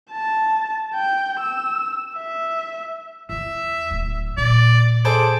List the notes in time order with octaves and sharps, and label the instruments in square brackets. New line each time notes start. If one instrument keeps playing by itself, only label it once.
[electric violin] A5
G5
E6
E5
[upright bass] E2 C#3 [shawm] E5
[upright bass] D1
[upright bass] A#2 C#3 [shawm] D5
[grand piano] G#4 A4 C5 [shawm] D6